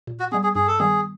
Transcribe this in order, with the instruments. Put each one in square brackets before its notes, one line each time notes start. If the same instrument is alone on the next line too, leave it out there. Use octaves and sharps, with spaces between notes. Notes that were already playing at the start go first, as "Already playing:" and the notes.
[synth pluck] A#2
[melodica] F#4
[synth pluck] G3 B3 [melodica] G#4
[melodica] G#4
[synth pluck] G2 [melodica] G#4
[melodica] A4
[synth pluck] D#3 G3 B3 [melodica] G#4